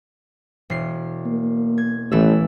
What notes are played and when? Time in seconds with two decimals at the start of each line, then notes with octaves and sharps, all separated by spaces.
0.70 E1 C7
1.26 A#3
1.78 G#6
2.11 A1 E3 A3 E6